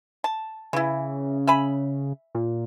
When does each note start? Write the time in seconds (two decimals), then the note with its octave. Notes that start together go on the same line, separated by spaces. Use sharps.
0.24 A5
0.73 C#3 E3 E4
1.47 E5 G#5 B5
2.35 A#2